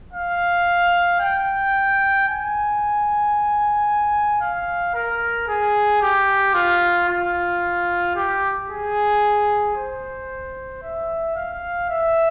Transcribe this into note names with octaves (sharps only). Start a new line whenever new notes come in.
F5
G5
G#5
F5
A#4
G#4
G4
F4
F4
G4
G#4
C5
E5
F5
E5